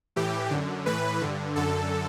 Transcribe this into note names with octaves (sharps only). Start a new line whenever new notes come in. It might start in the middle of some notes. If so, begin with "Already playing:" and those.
A2 E3 G4
F#2 D3
A2 E3 B4
G2 D3
F#2 D3 A4